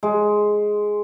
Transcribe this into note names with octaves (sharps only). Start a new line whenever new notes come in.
G#3